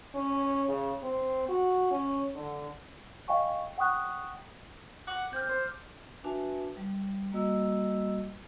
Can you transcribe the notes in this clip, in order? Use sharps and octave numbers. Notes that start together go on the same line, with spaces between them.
C#4
C#3
C4
F#4
C#4
D3
D#5 F5 G5 G#5 C#6
F#5 G5 C#6 D#6 F#6
F#5 D6
C4 F6 G6
C5
D4 F#4 B4 E5 G#5 A5
G3
G3 A#3 F#4 D#5 E6